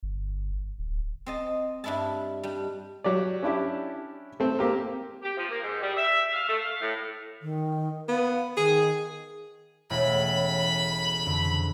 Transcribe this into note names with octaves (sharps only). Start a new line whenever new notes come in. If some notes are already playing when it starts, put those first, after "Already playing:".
G1
D1
C4 D#5 A5
G2 D4 E4 E5 A5
G3 D4
F#3 G4 D5
C#4 D4 E4 G4
A3 C4
A#3 C4 G4 A#4
G4
F3
A#3
G#2
G3
E5
F5
A3
F5
A2
D#3
B3 F5
D#3 G#4
E1 A2 C#3 B5
F2 D3